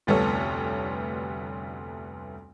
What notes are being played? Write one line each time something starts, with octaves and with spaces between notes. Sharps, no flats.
F1 D2 G3 B3 A4 C#5